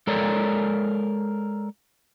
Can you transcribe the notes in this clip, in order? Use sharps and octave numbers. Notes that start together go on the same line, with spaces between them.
G#3 A4 A#4 C#5 D5